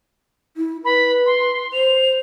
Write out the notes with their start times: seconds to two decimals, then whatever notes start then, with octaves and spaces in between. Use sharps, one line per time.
0.57 E4
0.85 B4 B5
1.26 C6
1.72 C5 F7